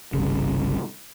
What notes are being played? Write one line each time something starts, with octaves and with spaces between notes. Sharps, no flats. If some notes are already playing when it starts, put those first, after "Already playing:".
G1 C2 C#3